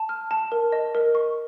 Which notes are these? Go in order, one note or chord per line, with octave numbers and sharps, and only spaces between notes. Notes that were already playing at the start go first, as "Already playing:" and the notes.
Already playing: A5
F6
A5
A#4
D#5
A#4
C#6